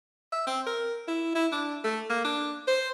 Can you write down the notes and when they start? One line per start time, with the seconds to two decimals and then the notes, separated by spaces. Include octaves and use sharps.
0.32 E5
0.47 C4
0.66 A#4
1.08 E4
1.35 E4
1.52 D4
1.84 A3
2.10 A#3
2.25 D4
2.67 C5